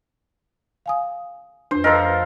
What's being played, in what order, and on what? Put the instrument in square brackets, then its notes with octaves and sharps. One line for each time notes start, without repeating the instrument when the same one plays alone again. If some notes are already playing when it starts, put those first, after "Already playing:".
[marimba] F5 G#5 D#6
[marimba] F2 D4 [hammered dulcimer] C5
[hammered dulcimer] F3 A4 A#4 [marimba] D#5